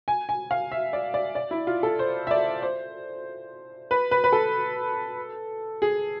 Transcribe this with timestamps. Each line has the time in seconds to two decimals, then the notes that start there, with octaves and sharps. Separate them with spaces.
0.08 G#5
0.29 G#5
0.51 F5
0.72 E5
0.93 D5
1.14 D5
1.35 D5
1.51 E4
1.67 F4
1.83 A4
1.99 C5
2.27 E5
2.31 D5
2.62 C5
3.91 B4
4.11 B4
4.24 B4
4.33 A4
5.82 G#4